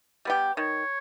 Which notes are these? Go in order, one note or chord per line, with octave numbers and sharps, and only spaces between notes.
G3 B3 G4
D#3 C#5